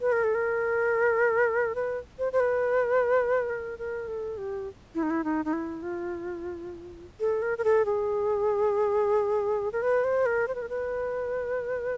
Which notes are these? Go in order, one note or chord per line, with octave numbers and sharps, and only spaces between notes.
B4
A#4
A4
A#4
B4
C5
C5
B4
A#4
A#4
A4
G4
E4
D#4
E4
D#4
D#4
E4
F4
A4
A#4
A#4
A4
G#4
A#4
B4
C5
A#4
C5
B4
A#4
B4